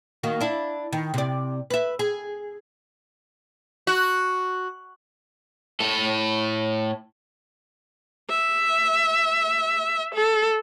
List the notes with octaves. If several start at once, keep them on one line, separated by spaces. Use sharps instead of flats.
D#3 A#3 F#4
D4 E4
D#3
C3 D5
B4 E5
G#4
F#4
A2 A4
E5
A4